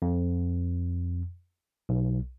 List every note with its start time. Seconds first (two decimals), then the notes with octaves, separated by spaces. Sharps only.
0.02 F2
1.89 B1